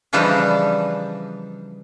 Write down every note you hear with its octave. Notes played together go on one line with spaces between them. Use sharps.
C#3 E3 F3 G3 D4 D#4